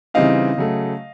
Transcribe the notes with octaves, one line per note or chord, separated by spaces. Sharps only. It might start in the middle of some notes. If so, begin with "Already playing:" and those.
C#3 E3 G3 C4 D#4 D#5 F5
C#3 F#3 A3